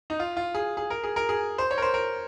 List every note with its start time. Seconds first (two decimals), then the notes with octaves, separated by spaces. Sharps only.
0.10 D#4
0.20 F4
0.37 F4
0.55 G#4
0.77 G#4
0.90 A#4
1.04 G#4
1.16 A#4
1.29 G#4
1.58 C5
1.71 C#5
1.78 A#4
1.82 C5
1.94 A#4